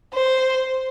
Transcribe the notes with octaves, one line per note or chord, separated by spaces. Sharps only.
C5